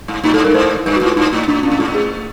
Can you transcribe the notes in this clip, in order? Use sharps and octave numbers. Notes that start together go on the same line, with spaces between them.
G#2
A2 D#4
G#2 A4
G2 A#4
G#2 C5
G2 B4
F#4
G#2
F4
G#2 D#4
A2
A2 D4
A#2 C#4
A2
G#2 F4
A2
G#4